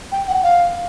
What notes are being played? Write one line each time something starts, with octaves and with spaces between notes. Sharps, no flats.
G5
F#5
F5